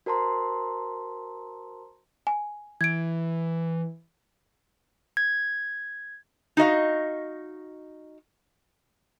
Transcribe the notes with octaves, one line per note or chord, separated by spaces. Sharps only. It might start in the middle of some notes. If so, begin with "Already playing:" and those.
F#4 A#4 C5 A5 A#5 C6
G#5
E3 G#6 D7
G#6
D#4 F#4 D#5 F5